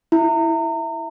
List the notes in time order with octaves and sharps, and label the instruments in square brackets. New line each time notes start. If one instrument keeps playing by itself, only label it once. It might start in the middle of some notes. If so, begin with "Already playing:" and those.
[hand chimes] E4